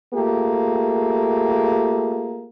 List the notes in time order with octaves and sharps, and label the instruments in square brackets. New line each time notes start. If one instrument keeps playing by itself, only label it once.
[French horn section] A3 A#3 F4 G4 G#4